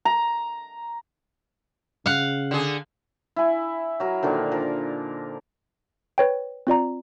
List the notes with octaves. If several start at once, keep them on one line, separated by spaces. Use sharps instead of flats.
A#5
C#3 F5 F#5
D3 G#4
E4 G#5
F#3 A#4
A#2 D3 D#3 F3
F3 A#4
B4 C#5 G5
C4 F4 D5 A#5